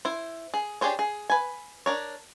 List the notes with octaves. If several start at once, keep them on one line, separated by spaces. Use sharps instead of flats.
E4 C5
G#4
D4 G4 G#4 C5 C#5
G#4
B4 G#5
D4 A#4 C#5